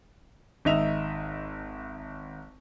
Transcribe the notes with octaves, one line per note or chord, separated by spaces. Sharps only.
G#1 D#4 D#5 E5 F7